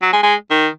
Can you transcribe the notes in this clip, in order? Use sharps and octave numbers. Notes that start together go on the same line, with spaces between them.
F#3
G#3
G#3
D#3